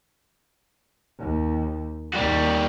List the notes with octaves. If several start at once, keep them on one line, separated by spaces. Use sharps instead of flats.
D#2
D#2 G3 A#3 F#4